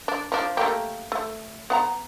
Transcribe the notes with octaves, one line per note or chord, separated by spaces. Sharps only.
D4
F3 D4
A3 A#3 G4
A3
B3 F#5 A#5